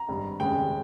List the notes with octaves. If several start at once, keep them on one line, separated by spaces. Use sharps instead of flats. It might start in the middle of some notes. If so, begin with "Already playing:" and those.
Already playing: A#5
G#1 G2 G3
F1 D#2 C#3 G#3 G5